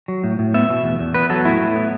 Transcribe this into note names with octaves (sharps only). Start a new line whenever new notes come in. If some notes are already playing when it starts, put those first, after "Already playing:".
F#3
A2
A2
B3 E5
B2
E2
E2
B3 B4
F#3 A4
A2 E4
A2
B3